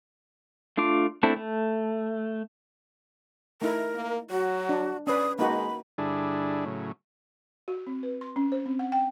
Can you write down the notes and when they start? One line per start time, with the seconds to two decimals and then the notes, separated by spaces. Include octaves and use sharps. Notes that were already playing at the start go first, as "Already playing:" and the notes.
0.77 A3 D4 F4 D6
1.23 A3 C4 D4 E4 A4
1.36 A3
3.62 A3 D#4 E4 A#4
3.95 A#3
4.30 F#3 F#4
4.69 D4
5.07 C#4 B4 D5 D#6
5.39 G#3 A#3 D#4 F#4 B5
5.98 G2 D3 D4 E4 G#4
6.65 A2 C#3 F#3
7.68 F#4
7.87 C4
8.03 B4
8.21 C6
8.36 C#4
8.52 C5
8.66 C4
8.79 F#5
8.92 G5